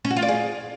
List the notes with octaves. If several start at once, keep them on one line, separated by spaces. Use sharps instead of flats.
C#4
F#4
F4
D5
G#4